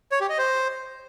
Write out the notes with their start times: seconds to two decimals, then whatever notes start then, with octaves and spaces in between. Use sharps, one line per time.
0.12 C#5
0.21 G4
0.30 D#5
0.38 C5